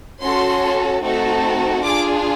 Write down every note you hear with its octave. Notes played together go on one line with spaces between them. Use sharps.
C#4 F#4 A4 C6
A3 C4 D#4 F#4 A4
D4 F4 G#4 D6